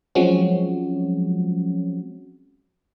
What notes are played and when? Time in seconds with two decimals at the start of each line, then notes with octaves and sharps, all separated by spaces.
0.15 F3 F#3 G#3 C4 C#4 F#4